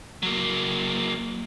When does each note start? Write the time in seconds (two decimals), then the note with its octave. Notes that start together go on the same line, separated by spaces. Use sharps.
0.23 F#3 A#3